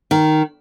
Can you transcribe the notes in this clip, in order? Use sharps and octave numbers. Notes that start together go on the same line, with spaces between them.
D#3